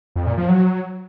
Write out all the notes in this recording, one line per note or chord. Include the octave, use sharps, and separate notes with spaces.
F2
A#2
F3
F#3